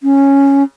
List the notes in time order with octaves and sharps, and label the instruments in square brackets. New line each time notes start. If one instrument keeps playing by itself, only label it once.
[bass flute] C#4